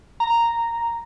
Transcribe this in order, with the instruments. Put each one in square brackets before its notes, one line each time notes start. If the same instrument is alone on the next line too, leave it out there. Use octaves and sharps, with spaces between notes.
[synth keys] A#5